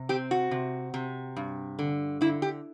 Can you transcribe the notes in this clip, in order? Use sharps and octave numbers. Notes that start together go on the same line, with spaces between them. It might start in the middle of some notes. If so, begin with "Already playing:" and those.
Already playing: C3
C4 G4
F#4
C3
C3
G2
D3
D3 E4
G4